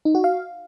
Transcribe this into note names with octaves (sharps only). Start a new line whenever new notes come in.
D#4
F#4
F5